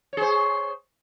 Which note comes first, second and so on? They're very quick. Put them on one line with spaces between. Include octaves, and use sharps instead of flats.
C#5 G#4 C5